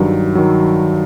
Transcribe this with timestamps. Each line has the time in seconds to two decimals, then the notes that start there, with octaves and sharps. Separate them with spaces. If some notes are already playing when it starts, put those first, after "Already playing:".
Already playing: G2 D#3 F#3
0.35 D#3 F#3